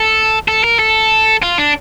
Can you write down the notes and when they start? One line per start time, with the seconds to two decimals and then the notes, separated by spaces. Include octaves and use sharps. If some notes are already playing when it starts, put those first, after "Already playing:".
Already playing: A4
0.48 A4
0.64 A#4
0.79 A4
1.43 F4
1.58 D4